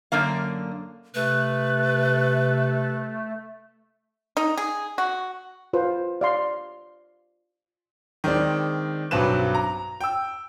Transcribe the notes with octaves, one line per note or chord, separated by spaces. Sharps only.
F#2 D3 A#3 F5
C3 A3 B4
D#4
G#4
F#4
F4 B4 C5
D5 F5 C6
D#3 G#3 C4 D4
B1 G2 F#3 C4 B4 E7
A#5
G5 E6